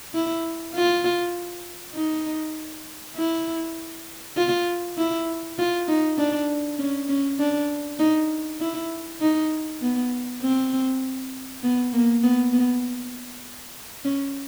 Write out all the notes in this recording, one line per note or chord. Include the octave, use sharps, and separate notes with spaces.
E4
F4
D#4
E4
F4
E4
F4
D#4
D4
C#4
C#4
D4
D#4
E4
D#4
B3
C4
B3
A#3
B3
B3
C#4